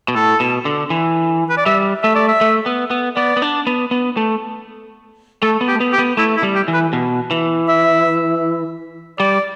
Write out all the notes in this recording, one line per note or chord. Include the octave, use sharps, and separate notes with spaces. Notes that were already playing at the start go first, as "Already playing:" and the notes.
B2
A2 A4
B2
D3
E3
B4
D5
G3 E5
A3 E5
D5
E5
A3
B3
B3
B3 D5
B3
D4
B3
B3
A3
A3 A4
B3
G4
A3
B3
G4
B3
A3 E4
E4
G3
G4
E3
B4
B2
E3
E5
G3 D5